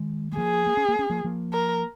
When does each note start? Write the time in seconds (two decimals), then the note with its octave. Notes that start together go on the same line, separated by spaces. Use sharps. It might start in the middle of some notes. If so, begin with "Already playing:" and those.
Already playing: D#3 G#3
0.32 G#3
0.37 F3 A#3 G#4
0.67 A#3
0.77 C#4
0.89 A#3
0.99 C#4
1.10 F3 A#3
1.24 F3 A#3
1.53 A#4